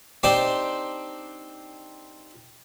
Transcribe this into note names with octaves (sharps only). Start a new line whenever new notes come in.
C4 D4 D#4 G4 C5 D5